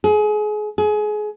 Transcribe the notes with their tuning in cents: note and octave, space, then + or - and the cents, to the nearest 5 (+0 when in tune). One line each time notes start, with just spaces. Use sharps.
G#4 +30
G#4 +25